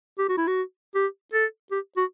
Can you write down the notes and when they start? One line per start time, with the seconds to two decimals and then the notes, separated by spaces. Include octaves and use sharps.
0.19 G4
0.29 F#4
0.38 E4
0.48 F#4
0.96 G4
1.34 A4
1.72 G4
1.97 F#4